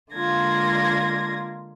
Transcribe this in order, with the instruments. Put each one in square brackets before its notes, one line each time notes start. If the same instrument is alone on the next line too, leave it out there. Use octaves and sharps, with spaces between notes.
[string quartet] D3 G#3 A#3 F4 G#6 A#6